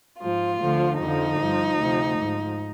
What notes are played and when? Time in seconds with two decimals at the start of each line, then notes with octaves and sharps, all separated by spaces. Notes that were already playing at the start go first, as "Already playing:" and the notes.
0.22 G#2 F3 F4
0.61 D2 D3 F3
1.00 F2 D3 F3 D#4
1.40 G2 F3
1.78 D2 C3 F3
2.18 G#2 F3